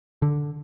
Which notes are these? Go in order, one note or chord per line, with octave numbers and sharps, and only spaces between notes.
D3